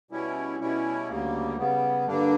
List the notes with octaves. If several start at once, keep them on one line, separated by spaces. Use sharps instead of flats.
B2 G3 C#4 E4
B2 G3 C#4 E4
D2 C#3 G3 A#3
C#3 G3 B3
G2 D3 G3 A#3 D4